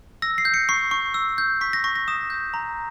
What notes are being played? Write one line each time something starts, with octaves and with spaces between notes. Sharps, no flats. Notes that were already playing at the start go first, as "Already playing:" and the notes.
E6 A#6
C7
G6
C#7
C#6 C7
C#6
E6
G6
C#6 B6
A#6
C#6 A#6
A#6
D#6 E7
G6
A#5